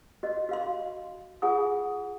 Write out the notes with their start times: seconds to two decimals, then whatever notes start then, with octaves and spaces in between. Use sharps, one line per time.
0.23 F#4 D#5
0.49 F#4 F5 C6
1.42 F4 G#4 F#5 G#5 D#6